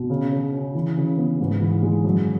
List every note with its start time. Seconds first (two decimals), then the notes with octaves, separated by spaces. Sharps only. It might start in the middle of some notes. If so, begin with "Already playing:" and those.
Already playing: B2
0.10 C#3
0.32 C#3
0.53 C#4
0.75 E3
0.97 C#3
1.18 B3
1.40 G#2
1.61 E3
1.83 G#3
2.04 F#2